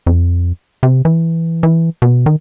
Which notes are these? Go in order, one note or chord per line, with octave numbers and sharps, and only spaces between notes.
F2
C3
E3
E3
B2
D#3